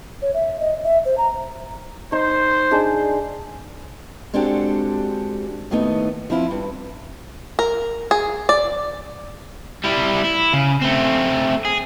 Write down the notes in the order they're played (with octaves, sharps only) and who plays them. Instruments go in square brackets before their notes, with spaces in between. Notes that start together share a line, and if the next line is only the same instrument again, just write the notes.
[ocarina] C#5
E5
D#5
E5
C5
A#5
[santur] D#4 [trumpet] C5
[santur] D4 D#4 G#4
[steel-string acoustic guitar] G#3 C4 D4 F#4 G4 A4
D#2 A2 A3 B3 D#4
F3 C4 E4 F4
G2
[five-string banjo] A#4
G#4
D5
[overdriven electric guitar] G3 E4
E4
C#3
A3 C4
G#4